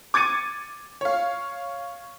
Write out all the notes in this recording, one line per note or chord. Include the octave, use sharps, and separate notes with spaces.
D6 G#6 A6 C#7 D#7
C#5 F5